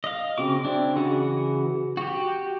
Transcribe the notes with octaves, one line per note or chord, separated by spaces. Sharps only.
D#5 F5
C#3 C4 F#4 D6
C4 D4 E4
C#3 E3 F#4 G#4 F#5
F#4 G4